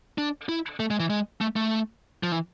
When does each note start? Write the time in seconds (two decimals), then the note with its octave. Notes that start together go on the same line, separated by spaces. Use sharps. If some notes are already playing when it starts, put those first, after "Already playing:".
0.18 D4
0.49 E4
0.80 A3
0.91 G#3
1.00 E3
1.10 G#3
1.41 A3
1.56 A3
2.23 F3
2.32 E3